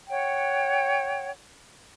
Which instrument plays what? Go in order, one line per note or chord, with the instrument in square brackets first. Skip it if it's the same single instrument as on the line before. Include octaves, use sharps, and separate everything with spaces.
[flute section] C#5 F#5 G5